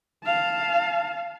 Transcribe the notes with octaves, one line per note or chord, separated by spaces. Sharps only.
F5 A5